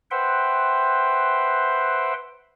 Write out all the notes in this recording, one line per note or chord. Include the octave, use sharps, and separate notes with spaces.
B4 C5 E5 F#5 G5 C6